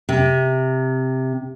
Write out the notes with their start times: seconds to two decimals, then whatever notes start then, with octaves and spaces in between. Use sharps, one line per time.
0.09 C3